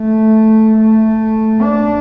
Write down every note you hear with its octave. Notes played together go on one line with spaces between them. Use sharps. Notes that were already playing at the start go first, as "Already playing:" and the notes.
Already playing: A3
A3
D4